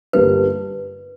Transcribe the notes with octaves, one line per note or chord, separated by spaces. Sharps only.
G1 G2 G3 A#3 B4